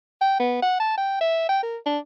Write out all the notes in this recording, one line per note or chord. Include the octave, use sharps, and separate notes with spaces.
G5
B3
F#5
A5
G5
E5
G5
A#4
D4